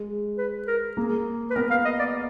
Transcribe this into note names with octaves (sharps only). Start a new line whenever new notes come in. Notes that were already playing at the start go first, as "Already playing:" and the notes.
Already playing: G#3
B4
A#4
A#3 G#4
B4
B3 A#4
F5
D#5
D5